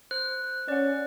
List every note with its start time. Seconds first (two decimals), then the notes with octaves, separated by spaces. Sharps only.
0.11 C5 F#6
0.68 C#4 D5 F#5